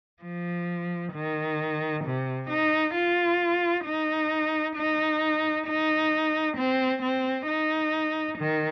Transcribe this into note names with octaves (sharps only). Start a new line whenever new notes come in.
F3
D#3
C3
D#4
F4
D#4
D#4
D#4
C4
C4
D#4
D#3